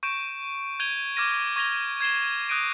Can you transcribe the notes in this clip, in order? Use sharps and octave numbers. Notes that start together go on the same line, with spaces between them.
C#6 G6 D7 E7
G6 G#6 D#7 F7 G7
D6 F6 G#6 A#6 D#7
C#6 G#6 A#6 F7 G7
G#6 C7 E7 G7
D#6 F#6 G6 A#6 D7 D#7